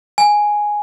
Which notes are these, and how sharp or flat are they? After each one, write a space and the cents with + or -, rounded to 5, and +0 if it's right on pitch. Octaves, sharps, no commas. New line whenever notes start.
G#5 +0